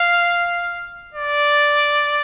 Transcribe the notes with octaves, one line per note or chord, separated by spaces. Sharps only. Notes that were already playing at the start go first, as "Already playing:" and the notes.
Already playing: F5
D5